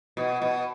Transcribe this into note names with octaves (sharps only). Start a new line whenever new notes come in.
B2
B2